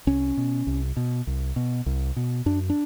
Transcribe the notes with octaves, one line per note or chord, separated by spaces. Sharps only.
C2 C#4
B2
C2
B2
C2
B2
C2
B2
F#2 D4
D4